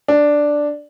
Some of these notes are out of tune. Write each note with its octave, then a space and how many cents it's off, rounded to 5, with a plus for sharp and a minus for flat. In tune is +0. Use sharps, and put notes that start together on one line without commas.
D4 +0